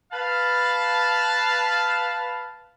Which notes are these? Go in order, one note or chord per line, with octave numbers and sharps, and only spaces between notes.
B4 F5 A5